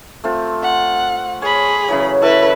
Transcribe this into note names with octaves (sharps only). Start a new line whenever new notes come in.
A3 C4 F4
F#5
G#4 C#5 B5
C#3 E3 F#3
E4 A4 B4